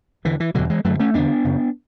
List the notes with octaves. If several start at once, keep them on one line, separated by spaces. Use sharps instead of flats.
E2 D3 E3
E3
E2 B2 D3 F#3
E3 G#3
F#2 D3 F#3 A3
A3 C#4
E2 D3 B3 D4
F#2 C#3